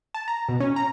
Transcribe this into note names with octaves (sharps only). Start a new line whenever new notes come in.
A5
A#5
B2
C#4
A#5